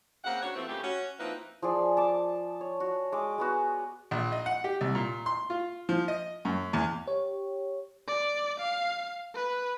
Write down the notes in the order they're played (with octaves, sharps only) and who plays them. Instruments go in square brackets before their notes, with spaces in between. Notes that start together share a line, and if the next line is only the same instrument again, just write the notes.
[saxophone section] C#3 A#3 C4 F#5
C#4 D4 F#4 C#5
B2 F3 A3 B3 C4 E4
A#2 C#3 A3 G4
C#4 F#4
F3 A#3 C4 D#4 E4 B4
[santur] F3 G#4 D5
A5 D6
C#5
F#4
G#3 D6
G#3 B3 F#4
[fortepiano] A#1
D#5
F#5
G4
C2
A#2
C6
F4
F3
D#5
F#2
E2
[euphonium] G4 [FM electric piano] C#5
[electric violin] D5
F5
B4